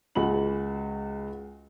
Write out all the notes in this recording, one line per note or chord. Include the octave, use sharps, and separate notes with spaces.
C#2 F#4 G#4 B5 F#7